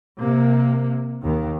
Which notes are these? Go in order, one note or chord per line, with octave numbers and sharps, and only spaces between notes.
C3 A#3
D#2 D#3